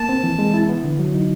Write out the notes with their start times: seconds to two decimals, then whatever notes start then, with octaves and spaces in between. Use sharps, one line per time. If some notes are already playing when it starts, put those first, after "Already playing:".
Already playing: A#3 A5
0.09 C4
0.24 E3
0.39 G#3
0.54 E4
0.69 B3
0.84 D3
0.99 F#3
1.14 D#4